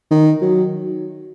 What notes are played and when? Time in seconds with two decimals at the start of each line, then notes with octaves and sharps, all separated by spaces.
0.11 D#3
0.41 F#3